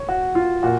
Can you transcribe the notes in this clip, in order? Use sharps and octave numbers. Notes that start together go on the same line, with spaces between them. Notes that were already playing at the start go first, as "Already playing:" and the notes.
Already playing: C#5
F#4
F4
A#2 F#4